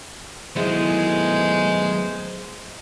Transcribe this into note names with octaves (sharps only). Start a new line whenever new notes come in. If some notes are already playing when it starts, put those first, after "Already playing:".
D#3 F#3 G#3 A3 B3 E4 G#4 C5